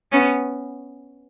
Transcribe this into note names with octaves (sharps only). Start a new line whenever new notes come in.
B3 C#4